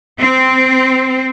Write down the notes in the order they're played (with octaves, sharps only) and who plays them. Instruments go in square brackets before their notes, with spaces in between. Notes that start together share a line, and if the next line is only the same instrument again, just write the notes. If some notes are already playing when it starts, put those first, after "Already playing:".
[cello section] C4